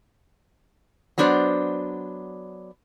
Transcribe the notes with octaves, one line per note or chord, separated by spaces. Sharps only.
F#3 B3 D4 C5 D5